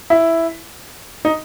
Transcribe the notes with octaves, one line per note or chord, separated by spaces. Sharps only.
E4
D#4